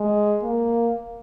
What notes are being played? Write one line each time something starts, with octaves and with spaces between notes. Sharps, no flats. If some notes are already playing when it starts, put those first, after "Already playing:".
Already playing: G#3
A#3